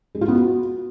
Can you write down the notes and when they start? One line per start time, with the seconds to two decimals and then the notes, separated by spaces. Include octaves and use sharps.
0.15 G#3
0.21 F4
0.28 B3
0.35 F#4